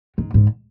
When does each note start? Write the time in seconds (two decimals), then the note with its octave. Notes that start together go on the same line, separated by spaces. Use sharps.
0.18 G#2
0.34 G#2